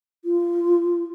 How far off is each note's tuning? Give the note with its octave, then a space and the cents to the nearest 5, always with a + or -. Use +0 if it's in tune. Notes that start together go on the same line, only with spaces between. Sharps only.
F4 -20